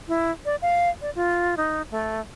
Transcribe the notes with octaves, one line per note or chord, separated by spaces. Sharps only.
E4
D5
F5
D5
F4
D#4
A3